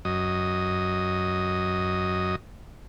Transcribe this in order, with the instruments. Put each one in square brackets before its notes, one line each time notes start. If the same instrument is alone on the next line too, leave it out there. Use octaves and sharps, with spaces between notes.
[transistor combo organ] F#2 D#5